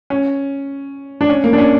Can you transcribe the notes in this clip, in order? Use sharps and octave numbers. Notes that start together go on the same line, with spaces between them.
C#4
D4
C#4
A#3
D4
C#4